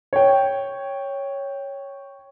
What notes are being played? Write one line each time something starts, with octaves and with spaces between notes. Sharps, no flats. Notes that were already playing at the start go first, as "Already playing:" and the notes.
C#5 G5